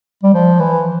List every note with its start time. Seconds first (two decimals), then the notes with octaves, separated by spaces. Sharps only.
0.23 G3
0.34 F3
0.59 E3